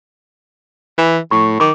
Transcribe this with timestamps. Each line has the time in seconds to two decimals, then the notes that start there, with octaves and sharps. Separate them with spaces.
0.98 E3
1.31 A2 C#6
1.60 D#3 D6